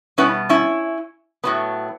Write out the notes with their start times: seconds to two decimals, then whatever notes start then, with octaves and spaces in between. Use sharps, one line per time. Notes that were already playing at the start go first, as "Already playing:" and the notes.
0.18 B2 G3 B3 C#4 E4
0.49 C#4 E4
1.44 A2 F#3 B3